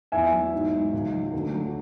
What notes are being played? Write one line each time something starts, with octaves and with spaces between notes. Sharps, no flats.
E2 E5 G#5
F#3
G#2
G#2
C#2
F#3
D2
F#3